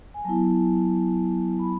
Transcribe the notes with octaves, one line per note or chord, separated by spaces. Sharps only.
G#5
F#3 B3 E4 A5
B5